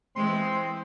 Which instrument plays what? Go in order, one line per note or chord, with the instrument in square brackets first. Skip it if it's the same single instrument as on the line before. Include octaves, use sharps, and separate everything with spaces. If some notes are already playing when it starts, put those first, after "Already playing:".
[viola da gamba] E3 G#3 [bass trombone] C4 [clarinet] C6